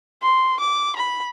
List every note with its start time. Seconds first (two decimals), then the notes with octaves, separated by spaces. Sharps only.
0.22 C6
0.60 D6
0.96 B5